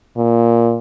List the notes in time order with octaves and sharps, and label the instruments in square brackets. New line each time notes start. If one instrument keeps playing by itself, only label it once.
[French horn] A#2